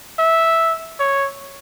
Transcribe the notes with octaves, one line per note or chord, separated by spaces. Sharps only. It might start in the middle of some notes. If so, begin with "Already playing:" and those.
E5
C#5